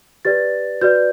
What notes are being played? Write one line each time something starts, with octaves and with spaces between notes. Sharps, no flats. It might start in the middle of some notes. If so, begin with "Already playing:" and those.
G4 B4 D5 A6
F#4 B4 D5 G6